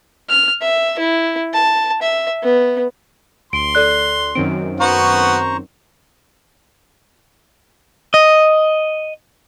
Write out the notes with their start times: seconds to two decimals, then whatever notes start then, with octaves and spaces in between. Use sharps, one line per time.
0.30 F6
0.62 E5
0.99 E4
1.54 A5
2.02 E5
2.44 B3
3.53 D2 C6 D7
3.75 A4 D5 F#6
4.35 F#2 D#3 C4 D7
4.80 B3 F#4 C5 F#5 A#5 C#6
8.14 D#5